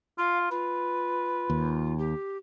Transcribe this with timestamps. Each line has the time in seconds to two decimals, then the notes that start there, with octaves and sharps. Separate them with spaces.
0.18 F4 F5
0.51 F4 B4
1.50 D#2
1.98 G4